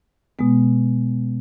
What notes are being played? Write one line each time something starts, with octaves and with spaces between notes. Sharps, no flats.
B2 G#3 B3